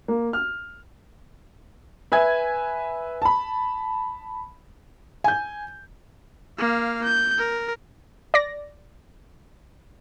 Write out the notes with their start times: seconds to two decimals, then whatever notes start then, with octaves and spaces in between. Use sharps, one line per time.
0.08 A#3
0.33 F6
2.12 B4 E5 G#5 G#6
3.22 A5 B5
5.24 G#5 G6
6.58 A#3 F5
7.04 G6
7.38 A#4
8.34 D5 A#6